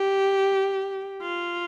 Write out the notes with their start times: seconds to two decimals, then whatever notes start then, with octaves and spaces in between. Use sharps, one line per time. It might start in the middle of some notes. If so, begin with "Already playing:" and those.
Already playing: G4
1.21 F4